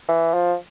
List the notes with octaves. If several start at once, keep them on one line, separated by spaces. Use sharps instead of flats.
E3
F3